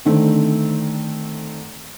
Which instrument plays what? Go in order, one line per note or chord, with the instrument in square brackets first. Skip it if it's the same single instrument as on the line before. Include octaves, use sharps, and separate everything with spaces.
[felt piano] D3 D#3 A3 C4